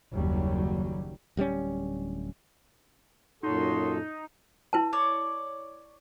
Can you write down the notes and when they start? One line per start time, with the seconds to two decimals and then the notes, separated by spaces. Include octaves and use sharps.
0.12 F#1 D#2 F#3 G3
1.37 D1 G3 G#3 C#4
3.43 F#2 A#2 D#4 F#4 A4 C#5 C6
4.73 E4 B4 A5
4.93 C#5 D5